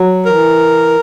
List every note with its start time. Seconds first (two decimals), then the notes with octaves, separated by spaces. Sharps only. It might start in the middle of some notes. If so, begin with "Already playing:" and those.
Already playing: F#3
0.26 E3 A#4